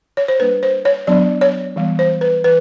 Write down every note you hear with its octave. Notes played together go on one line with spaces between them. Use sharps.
C#5
C5
G3 A#3 D4 B4
C5
C#5
F#3 B3 D4 D5
C#5
E3 G3 B3
C5
B4
E3 B4